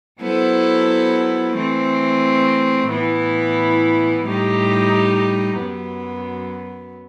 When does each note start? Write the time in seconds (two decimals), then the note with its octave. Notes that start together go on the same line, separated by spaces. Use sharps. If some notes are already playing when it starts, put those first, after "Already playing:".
0.21 F#3 B3 E4 A4 C5
1.56 E3 A3 C4
2.90 A2 E3 B3 E4
4.24 A2 G3 D#4 G4
5.58 F#2 F#3 B3